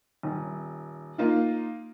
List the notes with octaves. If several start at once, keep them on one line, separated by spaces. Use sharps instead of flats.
D#1
A#3 D#4 F4